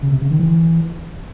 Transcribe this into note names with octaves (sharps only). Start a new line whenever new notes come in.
C#3
C3
C#3
D#3
E3